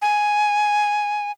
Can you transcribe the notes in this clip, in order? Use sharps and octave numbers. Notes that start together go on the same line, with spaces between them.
G#5